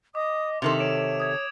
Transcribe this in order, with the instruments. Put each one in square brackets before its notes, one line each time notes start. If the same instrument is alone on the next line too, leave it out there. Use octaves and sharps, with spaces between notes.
[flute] D#5 [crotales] D6 [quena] D#6
[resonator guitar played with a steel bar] C3 D#3 A4 [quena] E5 [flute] C6 [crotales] F7 F#7
[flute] C#5 [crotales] D7 E7
[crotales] D#6 G#6